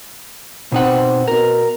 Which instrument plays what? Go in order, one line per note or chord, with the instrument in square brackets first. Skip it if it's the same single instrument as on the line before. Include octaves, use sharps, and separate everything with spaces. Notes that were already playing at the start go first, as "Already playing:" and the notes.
[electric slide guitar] B2 D#4 F#5 [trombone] C4
[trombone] B2 [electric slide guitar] A#4